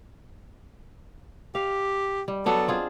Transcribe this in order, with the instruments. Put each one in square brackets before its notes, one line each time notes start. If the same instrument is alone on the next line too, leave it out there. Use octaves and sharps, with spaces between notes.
[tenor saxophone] G4 [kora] F5
[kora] G3
[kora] F#3 B3 D4 [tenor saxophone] A4
[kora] C4 F4 G#4